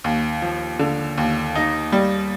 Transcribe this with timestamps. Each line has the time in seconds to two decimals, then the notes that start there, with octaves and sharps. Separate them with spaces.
0.04 D#2
0.42 F3
0.79 D3
1.18 D#2
1.55 D#4
1.93 G3